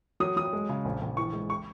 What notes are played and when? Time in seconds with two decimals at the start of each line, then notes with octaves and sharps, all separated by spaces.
0.20 F#3 D#6
0.36 F#3 D#6
0.53 G#3
0.69 C#3
0.85 A#1
1.01 A#1
1.17 E3 C#6
1.33 G#3
1.50 C#6